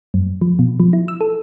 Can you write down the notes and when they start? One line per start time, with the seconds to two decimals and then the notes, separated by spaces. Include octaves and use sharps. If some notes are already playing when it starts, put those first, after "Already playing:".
0.14 F#2
0.41 F3
0.59 B2
0.80 F3
0.93 E4
1.08 E6
1.21 A4